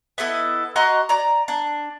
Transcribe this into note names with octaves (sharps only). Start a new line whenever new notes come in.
B3 E4 A4 D#5
F#4 D#5 A#5 C6
D5 A#5
D4